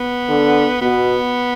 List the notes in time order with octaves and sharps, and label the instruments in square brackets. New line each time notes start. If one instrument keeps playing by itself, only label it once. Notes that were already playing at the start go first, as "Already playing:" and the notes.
Already playing: [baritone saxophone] B3
[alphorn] D3
[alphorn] B2 [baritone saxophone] B3